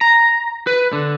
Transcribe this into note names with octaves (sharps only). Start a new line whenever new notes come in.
A#5
B4
D3